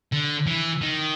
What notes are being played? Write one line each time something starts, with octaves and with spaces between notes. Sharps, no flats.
D3
E3
D#3